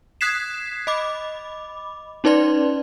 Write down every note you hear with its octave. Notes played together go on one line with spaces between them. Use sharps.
D#6 F#6 G#6 B6 C7 E7
D#5 B5 D6
C#4 D#4 B4 D5 C6